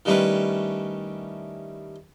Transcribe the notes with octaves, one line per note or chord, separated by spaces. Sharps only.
D#3 G3 A3 C#4 E4 B4